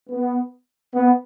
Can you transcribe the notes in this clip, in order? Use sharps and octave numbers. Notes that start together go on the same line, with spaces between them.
B3
B3